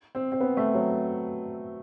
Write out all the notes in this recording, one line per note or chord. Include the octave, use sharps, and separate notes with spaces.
C4
C4
B3
A3
F#3